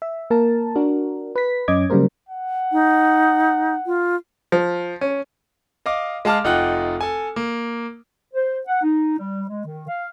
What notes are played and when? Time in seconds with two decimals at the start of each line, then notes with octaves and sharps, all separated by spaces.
0.02 E5
0.30 A#3 A#4 A5
0.75 D4 F#4 A#4
1.36 B4 B6
1.68 F#2 C#4 D#5 D6 G#6
1.90 C#3 F#3 G3 A#3 A#4 C5
2.29 F#5
2.72 D#4
3.86 F4
4.52 F3
5.01 C#4
5.86 D#5 F5 D6
6.25 G#3 F5 A5 D6 F6
6.44 F1 D#4 F4 F#5 G5 F#6
7.01 A4 G#5
7.36 A#3
8.34 C5
8.67 F#5
8.82 D#4
9.18 G3
9.48 G#3
9.65 D#3
9.88 F5